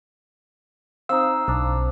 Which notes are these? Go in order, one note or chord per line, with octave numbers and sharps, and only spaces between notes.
C4 D#4 F5 E6
B1 D4 A#5